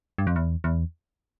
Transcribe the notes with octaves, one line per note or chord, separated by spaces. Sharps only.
G2
F2
E2
E2